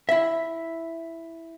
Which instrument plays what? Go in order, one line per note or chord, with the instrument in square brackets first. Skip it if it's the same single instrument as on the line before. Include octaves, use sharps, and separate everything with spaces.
[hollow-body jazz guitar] E4 E5